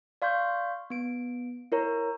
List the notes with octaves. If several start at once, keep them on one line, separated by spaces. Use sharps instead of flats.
D5 F5 C6 C#6 G6
B3 D7
E4 A#4 C#5 A#5